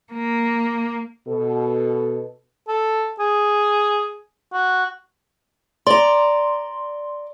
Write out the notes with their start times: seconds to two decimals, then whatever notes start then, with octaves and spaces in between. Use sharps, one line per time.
0.13 A#3
1.27 B2 A4
2.68 A4
3.19 G#4
4.53 F#4
5.87 D5 A#5 C6